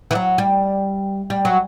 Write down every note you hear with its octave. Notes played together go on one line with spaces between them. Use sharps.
E3
F#3
G3
G3
F#3